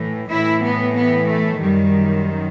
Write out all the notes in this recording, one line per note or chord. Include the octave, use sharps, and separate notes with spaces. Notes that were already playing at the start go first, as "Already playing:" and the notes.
Already playing: A2 E3
A2 E3 E4
B3
B3
A3
F#2 D#3 G3